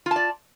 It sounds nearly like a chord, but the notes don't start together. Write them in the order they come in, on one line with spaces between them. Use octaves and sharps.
F4 A5 D5